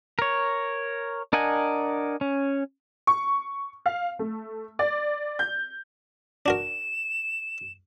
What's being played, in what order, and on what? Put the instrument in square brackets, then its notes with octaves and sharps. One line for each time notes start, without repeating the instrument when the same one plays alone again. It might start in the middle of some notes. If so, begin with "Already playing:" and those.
[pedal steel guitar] A#4 C#5
D4 A#4 D#5 F#5 G#5
C#4
[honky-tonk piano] C#6
F5
A3
D5
G6
[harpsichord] D4 F#4 A#4 [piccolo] E7